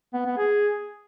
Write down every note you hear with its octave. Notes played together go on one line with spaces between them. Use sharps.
B3
B3
G#4